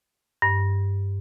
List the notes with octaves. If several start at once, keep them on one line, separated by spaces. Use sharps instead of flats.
G2